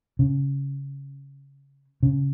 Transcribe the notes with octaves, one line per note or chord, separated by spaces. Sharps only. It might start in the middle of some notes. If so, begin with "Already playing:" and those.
C#3
C#3